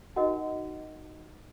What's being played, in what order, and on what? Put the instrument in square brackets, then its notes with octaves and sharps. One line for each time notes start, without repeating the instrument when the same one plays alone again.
[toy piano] D#4 F#4 A#4 D#5 F#5